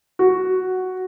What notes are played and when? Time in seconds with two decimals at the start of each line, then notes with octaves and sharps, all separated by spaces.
0.19 F#4